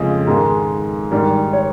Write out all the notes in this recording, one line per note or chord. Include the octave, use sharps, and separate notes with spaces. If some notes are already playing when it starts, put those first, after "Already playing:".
Already playing: F2 C#3 F3 G#3 D#5
G#2 D#3 G#3
G#2 D#3 G3
C#5